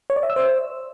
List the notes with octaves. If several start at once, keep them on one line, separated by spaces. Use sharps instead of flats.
C#5
D5
E5
E6
C5